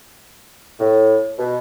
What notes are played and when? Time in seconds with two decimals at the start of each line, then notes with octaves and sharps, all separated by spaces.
0.79 A2
1.38 B2